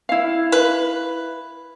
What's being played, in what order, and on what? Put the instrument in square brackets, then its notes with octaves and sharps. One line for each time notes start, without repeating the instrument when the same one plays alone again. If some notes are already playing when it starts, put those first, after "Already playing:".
[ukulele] E4 F5
[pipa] B4